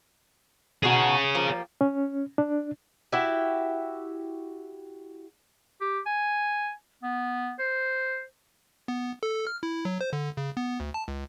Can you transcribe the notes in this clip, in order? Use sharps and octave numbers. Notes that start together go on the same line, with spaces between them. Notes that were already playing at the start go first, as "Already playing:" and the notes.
B2 D#4 F#4 G#4 C#5
F3 G3 A#3
C#4
D4
E4 F#4 G4 E5
G4
G#5
B3
C5
B3
A4
F6
E4
F#3
C5
D3
C#3
B3
D2
A5
C#2